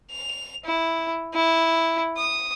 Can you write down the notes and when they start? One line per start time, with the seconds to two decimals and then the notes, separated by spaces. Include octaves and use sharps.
0.11 F7
0.65 E4
1.34 E4
2.17 D#6